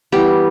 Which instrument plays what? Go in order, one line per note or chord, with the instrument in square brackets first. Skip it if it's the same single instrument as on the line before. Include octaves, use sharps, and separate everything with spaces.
[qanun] E3 G3 B3 G4